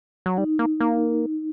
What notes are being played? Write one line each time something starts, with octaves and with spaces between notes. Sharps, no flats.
F#3
G3 D#4
A#3
A#3